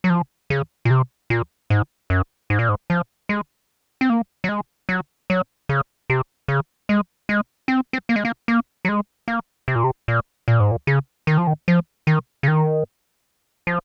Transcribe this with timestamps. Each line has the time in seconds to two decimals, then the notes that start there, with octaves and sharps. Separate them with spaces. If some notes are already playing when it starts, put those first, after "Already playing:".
0.04 F#3
0.10 F3
0.50 C#3
0.85 A#2
0.90 C3
1.30 A#2
1.70 G#2
2.10 F#2
2.50 G#2
2.59 A#2
2.69 G#2
2.90 F3
3.29 G#3
4.01 C4
4.10 A#3
4.44 F#3
4.49 G#3
4.89 F#3
5.30 F#3
5.69 C#3
6.10 C3
6.48 C#3
6.89 G#3
7.29 G#3
7.68 C4
7.93 C4
8.09 A#3
8.16 G#3
8.25 A#3
8.48 A#3
8.85 F#3
8.89 G#3
9.28 A#3
9.68 C3
9.76 A#2
9.84 C3
10.08 A#2
10.48 A#2
10.60 G#2
10.71 A#2
10.87 C#3
11.27 D#3
11.38 F3
11.47 D#3
11.68 F3
12.07 D#3
12.43 C#3
12.48 D#3
13.67 F3